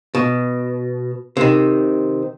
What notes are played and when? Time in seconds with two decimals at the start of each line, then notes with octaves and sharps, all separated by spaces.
0.15 B2
1.37 C3 D#3